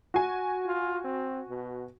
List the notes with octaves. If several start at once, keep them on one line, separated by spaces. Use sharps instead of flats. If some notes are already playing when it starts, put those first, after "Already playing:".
F#4 G#5
F4
C4
B2